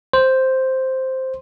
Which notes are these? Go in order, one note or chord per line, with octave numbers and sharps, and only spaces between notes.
C5